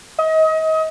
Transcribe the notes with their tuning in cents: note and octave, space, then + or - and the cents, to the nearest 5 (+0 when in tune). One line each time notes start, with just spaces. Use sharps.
D#5 +30